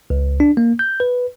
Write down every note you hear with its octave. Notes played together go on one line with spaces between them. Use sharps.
C#2
D4
A#3
G6
B4